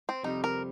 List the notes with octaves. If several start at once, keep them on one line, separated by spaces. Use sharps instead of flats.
C4
F2 C3 G3 D#4
A#4